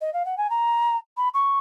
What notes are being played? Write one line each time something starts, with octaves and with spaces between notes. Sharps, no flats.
D#5
F5
F#5
G#5
A#5
B5
C#6